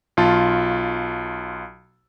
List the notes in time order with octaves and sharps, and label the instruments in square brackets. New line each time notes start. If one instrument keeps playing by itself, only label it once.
[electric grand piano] B1 F4 A5